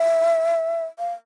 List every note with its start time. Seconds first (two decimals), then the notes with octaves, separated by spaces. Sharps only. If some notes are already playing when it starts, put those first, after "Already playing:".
Already playing: E5
0.99 F5